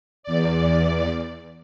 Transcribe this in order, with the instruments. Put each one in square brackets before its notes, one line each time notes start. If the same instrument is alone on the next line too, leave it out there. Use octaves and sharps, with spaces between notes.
[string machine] E2 D5